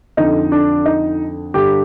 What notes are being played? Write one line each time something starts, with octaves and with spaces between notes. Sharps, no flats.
F2 D3 D#4
D4
D#4
G2 D3 G4